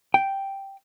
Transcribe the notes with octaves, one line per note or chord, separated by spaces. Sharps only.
G5